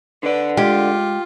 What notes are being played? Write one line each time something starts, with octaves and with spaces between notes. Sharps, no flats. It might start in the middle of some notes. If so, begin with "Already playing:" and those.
D3 B4 D5
G#3 F4 G4